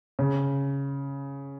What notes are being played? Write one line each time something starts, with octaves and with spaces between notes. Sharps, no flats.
C#3